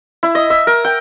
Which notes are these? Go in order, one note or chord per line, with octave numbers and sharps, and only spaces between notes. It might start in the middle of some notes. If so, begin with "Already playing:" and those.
E4
D#5
E5
A#4
G5